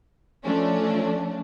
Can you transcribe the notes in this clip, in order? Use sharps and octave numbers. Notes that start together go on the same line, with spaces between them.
F3 A3 C#4 D4